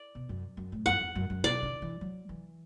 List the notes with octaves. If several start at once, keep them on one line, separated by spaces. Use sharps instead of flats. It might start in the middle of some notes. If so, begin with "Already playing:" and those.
Already playing: D5
B2
F#2
F#2
A2
F#2 F#5
E2
F#2
F#2
B2 D5
D3
E3
F#3
E3